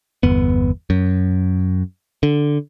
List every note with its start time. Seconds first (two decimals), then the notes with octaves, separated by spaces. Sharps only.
0.23 G1 E2 B3
0.90 F#2
2.23 D3